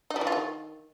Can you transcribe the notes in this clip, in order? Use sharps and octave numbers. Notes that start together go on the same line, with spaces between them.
D#4
G3
E3
F4
D#3